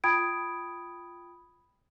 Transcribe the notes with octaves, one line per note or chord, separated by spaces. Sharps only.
F4 G5 B5 D#6 G#6 D7